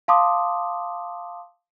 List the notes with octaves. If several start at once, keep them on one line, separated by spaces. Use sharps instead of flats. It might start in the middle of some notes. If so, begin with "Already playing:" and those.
F5 A5 C6 D6 D#6